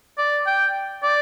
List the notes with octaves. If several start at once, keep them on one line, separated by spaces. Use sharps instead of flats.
D5
G5
D5